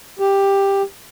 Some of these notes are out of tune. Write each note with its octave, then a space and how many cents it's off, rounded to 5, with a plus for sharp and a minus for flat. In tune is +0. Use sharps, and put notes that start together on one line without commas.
G4 +10